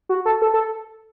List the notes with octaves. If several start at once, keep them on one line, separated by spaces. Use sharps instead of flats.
F#4
A4
A4
A4